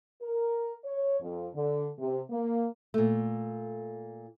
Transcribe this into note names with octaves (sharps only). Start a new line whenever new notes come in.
A#4
C#5
F2
D3
C3
A#3
A#2 A3